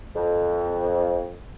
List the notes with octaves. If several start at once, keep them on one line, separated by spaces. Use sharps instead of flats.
F2